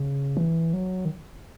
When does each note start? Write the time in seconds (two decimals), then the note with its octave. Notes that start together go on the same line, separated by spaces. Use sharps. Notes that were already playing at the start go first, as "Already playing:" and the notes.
Already playing: C#3
0.37 E3
0.73 F#3
1.05 D#3